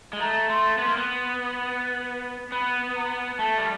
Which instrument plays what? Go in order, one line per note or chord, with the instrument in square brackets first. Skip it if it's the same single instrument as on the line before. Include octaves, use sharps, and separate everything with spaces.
[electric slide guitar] G#3
[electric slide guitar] A3 [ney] A#5
[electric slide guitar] A3 [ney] C6
[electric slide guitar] B3
A#3
B3
[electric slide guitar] B3 [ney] B5
[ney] A#5
[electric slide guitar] A3 [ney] A5
[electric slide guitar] G3